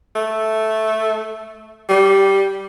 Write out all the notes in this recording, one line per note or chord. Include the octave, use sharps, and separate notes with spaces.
A3
G3